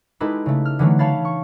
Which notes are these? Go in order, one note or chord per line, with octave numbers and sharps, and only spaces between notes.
G#3 D#4 E4 G4 A4 B4
C#3 A3
F6
D3 E3 F#3 A3
C#5 F5 A5 B5 A6 C7
C#6